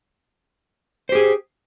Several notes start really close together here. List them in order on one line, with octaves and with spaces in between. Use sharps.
C5 G4 G#4